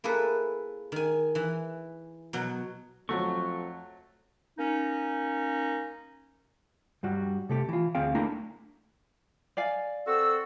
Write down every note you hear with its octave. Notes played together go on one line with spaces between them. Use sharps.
A#3 E4 G#4 A4 B4
D#3 G#5
E3
B2 F#3
F2 F#3 A3 C#6
A#3 C#4 D#4
G2 G3 F#4
C3 A3 G4
E3 F4
D2 C4 G#4 F5 G5
A3 A#3 D4 E4 G5 A#5
D5 F5 G#5
C4 F#4 A4 E6